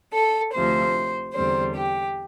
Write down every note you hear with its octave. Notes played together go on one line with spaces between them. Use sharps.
A4
D2 C3 F3 C5
E2 D3 G3 C4 C5
G4